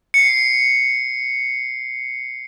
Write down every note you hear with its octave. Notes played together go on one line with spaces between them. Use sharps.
C7 C#7